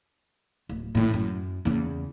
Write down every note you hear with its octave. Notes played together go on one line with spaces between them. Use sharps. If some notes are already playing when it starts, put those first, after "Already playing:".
D1
A1 A2
F#2
E2 C#3